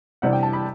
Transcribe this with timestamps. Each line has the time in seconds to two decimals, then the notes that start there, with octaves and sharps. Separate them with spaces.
0.22 C3 E3 G3 D4 F#5
0.33 G5
0.43 A5
0.53 B5